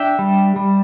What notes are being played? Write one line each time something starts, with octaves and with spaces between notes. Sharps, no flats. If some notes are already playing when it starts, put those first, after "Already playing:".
Already playing: D4 E5 G5
G3
G3